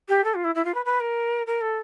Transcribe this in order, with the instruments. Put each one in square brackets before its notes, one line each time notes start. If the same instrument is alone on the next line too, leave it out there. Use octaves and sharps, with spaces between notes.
[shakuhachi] G4
A4
F4
E4
E4
F4
B4
B4
A#4
A#4
A4